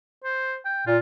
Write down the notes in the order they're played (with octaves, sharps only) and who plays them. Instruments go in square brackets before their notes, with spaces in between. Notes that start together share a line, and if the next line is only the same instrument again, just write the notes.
[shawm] C5
G5
[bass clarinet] A#2 [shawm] F4